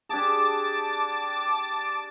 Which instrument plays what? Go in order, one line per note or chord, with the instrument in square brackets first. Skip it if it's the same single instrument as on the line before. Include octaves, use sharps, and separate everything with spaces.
[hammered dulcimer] D4 G4 G#4 [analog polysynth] A5 D6 A6